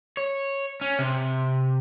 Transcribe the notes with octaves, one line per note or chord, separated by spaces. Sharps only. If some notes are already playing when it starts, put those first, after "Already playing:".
C#5
C#4
C3